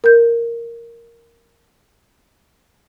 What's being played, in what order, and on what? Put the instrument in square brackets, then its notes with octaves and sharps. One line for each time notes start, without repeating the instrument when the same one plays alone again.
[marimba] A#4 G6